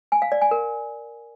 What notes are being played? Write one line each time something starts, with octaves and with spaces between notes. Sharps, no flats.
G#5
F5
D5
G#5
A#4